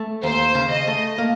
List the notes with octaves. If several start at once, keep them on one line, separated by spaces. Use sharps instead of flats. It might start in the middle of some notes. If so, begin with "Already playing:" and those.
Already playing: A3
D#2 C5
C#3
D#5
A3
A#3